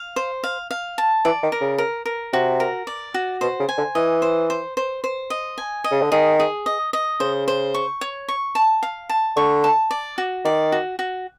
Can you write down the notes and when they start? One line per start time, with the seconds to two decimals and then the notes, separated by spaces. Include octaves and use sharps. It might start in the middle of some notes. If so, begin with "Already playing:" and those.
Already playing: F5
0.16 C5
0.44 F5
0.71 F5
0.98 A5
1.25 E3 D5
1.43 D#3
1.52 A#4
1.61 C#3
1.78 A#4
2.06 A#4
2.33 C3 F#4
2.60 A#4
2.87 D5
3.14 F#4
3.41 B2 C5
3.60 C#3
3.69 G#5
3.78 D3
3.95 E3 D#5
4.22 C5
4.50 C5
4.77 C5
5.04 C5
5.30 D#5
5.58 G#5
5.84 D#5
5.91 C#3
6.02 D3
6.12 D#3 G#4
6.40 G#4
6.66 D#5
6.93 D#5
7.20 C#3 C5
7.48 C5
7.74 C#6
8.01 C#5
8.28 C#6
8.55 A5
8.83 F5
9.09 A5
9.37 D3 C#6
9.64 A5
9.91 D5
10.18 F#4
10.44 D#3 D5
10.72 F#4
10.99 F#4